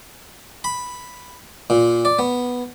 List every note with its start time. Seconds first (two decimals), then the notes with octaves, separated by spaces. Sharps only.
0.64 B5
1.70 A#2
2.05 D5
2.19 B3